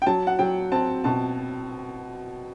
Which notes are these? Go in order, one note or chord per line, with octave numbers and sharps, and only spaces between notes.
G5
F#3 A5
F#5
F#3 G5
C4 A5
B2 A5